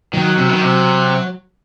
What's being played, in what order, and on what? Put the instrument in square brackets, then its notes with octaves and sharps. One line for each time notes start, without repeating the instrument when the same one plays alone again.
[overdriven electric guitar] D#3 [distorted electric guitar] F#3
[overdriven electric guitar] C3
D#3
C3